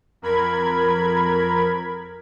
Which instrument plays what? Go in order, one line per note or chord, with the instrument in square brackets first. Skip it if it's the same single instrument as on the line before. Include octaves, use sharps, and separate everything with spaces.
[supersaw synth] F2 A#4 B5 G#6